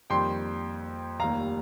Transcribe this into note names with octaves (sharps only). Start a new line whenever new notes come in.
F2 D#3 G3 A#3 G5 C6
F1 D#2 D#3 G3 A#3 F5 A#5